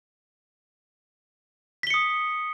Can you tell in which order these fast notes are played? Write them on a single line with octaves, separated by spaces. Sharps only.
B6 G7 C#7 D#6